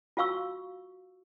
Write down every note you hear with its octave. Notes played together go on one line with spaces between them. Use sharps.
F4 F#4 F5 C#6 E6